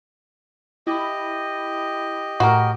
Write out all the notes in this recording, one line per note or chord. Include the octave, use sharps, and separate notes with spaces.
E4 G4 D#5 B5
A2 F#4 A#4